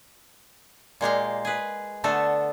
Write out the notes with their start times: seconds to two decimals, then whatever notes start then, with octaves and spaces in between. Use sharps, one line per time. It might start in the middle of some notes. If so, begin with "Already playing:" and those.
1.01 A#2 G#3 G4 F5
1.45 G#4 B4
2.04 D3 A3 B3 A4